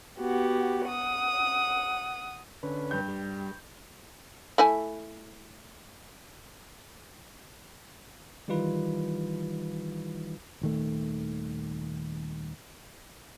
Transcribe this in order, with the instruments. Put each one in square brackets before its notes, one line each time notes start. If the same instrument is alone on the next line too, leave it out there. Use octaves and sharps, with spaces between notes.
[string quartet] B3 F#4 G4
F#5 D#6
[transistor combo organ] D3 C#4 B4
[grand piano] G2 G6
[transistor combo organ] G3
[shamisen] A3 E4 G#5
[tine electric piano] D#3 E3 G3 D#4 F4 B4
[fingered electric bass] D#1 D#3 A3